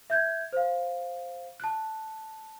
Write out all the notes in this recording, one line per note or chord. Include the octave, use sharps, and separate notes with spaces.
E5 G6 G#6
C5 F5
A5 F#6